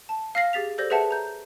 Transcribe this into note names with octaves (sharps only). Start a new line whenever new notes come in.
A5
F5 F6 A#6 C7
G4 G#4 A6 B6 F7
G4 A4 C5 D5 G6 A#6
G#4 B4 C#5 E5 F#5 A5
A#5 G6